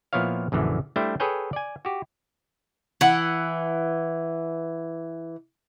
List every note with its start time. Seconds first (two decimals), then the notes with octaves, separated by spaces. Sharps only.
0.13 A#2 F3 B3 E4 C#5 F5
0.52 A#1 F#2 D3 E3
0.96 G3 A3 D4 E4 C5 G5
1.20 G#4 A4 B4 C#5 G5 G#5
1.53 D5 G#5
1.85 F#4 G4
3.01 E3 F#5